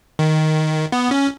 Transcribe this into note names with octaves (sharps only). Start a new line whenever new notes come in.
D#3
B3
C#4